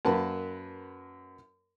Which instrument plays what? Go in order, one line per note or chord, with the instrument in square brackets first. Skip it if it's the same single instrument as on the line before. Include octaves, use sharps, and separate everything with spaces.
[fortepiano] F#2 A#3 B4 A5